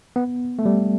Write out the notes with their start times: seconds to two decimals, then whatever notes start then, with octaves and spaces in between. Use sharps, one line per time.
0.16 B3
0.59 A3
0.65 G3